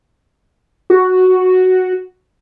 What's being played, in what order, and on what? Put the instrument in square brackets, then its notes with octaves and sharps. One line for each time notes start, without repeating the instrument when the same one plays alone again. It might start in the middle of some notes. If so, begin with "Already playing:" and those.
[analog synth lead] F#4